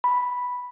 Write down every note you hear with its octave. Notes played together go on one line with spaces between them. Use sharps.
B5